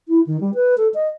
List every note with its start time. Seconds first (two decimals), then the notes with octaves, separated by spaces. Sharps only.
0.08 E4
0.26 D#3
0.40 G3
0.54 B4
0.77 A4
0.94 D#5